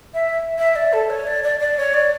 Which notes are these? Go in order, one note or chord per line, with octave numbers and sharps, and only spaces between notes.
E5
E5
D5
A4
C#5
D5
D5
D5
C#5
D5